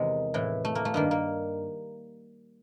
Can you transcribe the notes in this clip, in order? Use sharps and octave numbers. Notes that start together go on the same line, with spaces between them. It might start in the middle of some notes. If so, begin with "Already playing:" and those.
Already playing: E2 C3 D#3 G#3
A2 E3
A3
A#3
A3
G2 D#3 A#3
A#3